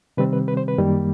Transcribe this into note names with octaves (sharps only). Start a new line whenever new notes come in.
C3 D#3 G3 C4 B4
B4
B4
C5
B4
F#2 D#3 G3 A#3